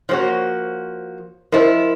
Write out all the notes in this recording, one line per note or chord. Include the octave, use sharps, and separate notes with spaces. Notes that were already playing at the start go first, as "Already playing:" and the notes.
F3 A#3 F#4 C5 C#5
F3 E4 A#4 C5 D#5